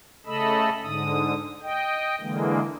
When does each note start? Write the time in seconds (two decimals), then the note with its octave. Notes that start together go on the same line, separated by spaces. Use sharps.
0.26 C#3 A3 A4 D#5 B5 E6
0.83 G#2 D3 D#6
1.62 D#5 G5
2.20 D3 E3 G#3 A#3